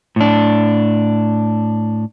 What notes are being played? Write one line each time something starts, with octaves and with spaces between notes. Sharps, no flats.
A2 D4